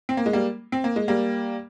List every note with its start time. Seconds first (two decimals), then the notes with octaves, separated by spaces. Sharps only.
0.09 C4
0.17 A#3
0.26 G#3
0.33 G3 A#3
0.72 C4
0.84 A#3
0.96 G#3
1.08 G3 A#3